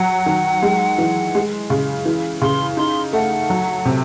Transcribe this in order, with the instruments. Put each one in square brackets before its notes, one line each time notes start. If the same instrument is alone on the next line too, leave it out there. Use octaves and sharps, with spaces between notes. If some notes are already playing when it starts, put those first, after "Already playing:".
Already playing: [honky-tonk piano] F#3 [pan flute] F#5
[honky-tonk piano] D#3
G#3
E3
G#3
C#3
E3
[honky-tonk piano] C#3 [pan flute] C6
[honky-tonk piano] D#4 [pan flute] C6
[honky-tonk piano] A3 [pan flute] F#5
[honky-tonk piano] F#3
C3